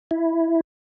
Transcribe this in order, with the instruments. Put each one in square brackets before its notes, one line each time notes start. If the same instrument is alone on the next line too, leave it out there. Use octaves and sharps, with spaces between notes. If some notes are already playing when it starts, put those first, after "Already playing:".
[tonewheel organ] E4